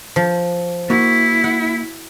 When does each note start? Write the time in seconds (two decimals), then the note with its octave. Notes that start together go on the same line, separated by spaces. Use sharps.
0.16 F3
0.90 A#3 E4 F#4
1.44 F#5